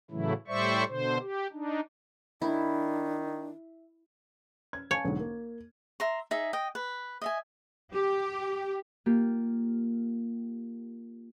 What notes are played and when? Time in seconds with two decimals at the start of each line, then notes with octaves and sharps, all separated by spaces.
0.11 A2 C#3 E3 F#3 A3 E4
0.48 A2 G3 C5 D5 E5 C#6
0.88 B2 D3 C5
1.20 G4
1.52 D4 D#4
2.42 D#3 D4 E4
4.73 G#6
4.91 C#5 F5 G#5 A5
5.05 B1 G#2 D3
5.20 A#3
6.00 E5 A#5 C6
6.31 D#4 G#4 E5
6.53 D#5 G5
6.75 B4
7.22 D#5 E5 G#5
7.93 G4
9.06 A#3 F4 G4